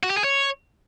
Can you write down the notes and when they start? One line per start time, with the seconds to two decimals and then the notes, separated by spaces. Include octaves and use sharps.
0.03 F#4
0.10 G4
0.17 G#4
0.24 C#5